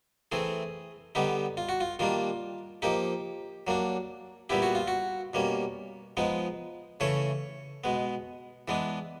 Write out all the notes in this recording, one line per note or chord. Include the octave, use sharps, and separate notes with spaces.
E3 A3 C4 G#4
D3 G3 B3 D#4 G4
F4
F#4
F4
D#3 G3 A#3 D4 F4
F3 A#3 D#4 G4
F#3 A#3 D4
A#2 G3 B3 E4 G4
F#4
F4
F#4
B2 G3 A#3 C#4
F3 G#3 B3 D#4
C#3 E3 A3 C#4 C#5
B2 G#3 B3
E3 G#3 B3 D4